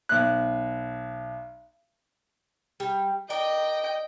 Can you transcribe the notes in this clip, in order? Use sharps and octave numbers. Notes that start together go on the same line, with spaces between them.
B1 F#6
G3
A#4 D5 D#5 G5